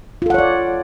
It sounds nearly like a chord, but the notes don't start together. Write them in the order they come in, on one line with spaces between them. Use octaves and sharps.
F4 A4 F#5 C#5 D5